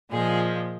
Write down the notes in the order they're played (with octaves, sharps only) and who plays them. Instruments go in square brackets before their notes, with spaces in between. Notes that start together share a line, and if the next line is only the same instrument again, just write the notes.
[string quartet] A#2 F3 G#3 G#4